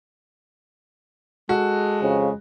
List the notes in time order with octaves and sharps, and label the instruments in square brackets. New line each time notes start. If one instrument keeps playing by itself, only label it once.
[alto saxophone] G#3 [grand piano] F#4 [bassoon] A4
[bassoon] F2 [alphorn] C#3